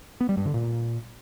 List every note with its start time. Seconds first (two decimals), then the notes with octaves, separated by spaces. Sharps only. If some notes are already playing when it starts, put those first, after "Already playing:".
0.21 B3
0.29 G3
0.37 G2
0.46 D3
0.54 A#2